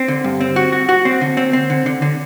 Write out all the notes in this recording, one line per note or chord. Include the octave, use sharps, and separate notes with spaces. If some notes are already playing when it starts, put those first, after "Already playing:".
Already playing: C4
D3
G2
C4
F#4
F#4
F#4
C4
D3
C4
C4
D3
D3
D3